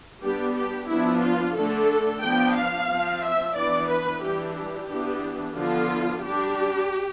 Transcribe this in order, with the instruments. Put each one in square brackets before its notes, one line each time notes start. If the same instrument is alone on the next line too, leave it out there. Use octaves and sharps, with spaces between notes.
[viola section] G3 B3 D4 G4
G4
F3 B3 D4 E4
F4
D3 A3 D4 A4
F3 B3 D4 G5
F5
F3 C4
E5
E3 B3 D4 D5
B4
E3 G3 D4 G4
G4
E3 B3 D4
D3 F3 B3 F4
G3 D4 G4